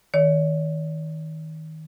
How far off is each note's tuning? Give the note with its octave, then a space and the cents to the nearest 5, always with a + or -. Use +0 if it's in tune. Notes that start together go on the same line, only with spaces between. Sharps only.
D#3 +20 C#5 +45